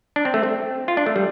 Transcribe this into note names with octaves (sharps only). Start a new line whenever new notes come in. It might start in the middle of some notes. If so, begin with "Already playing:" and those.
D4
C4
A3
C4
F4
D4
A3
G3